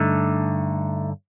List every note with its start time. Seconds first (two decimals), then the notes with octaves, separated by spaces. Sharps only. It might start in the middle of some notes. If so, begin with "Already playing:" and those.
Already playing: G2 D3 A3 D#4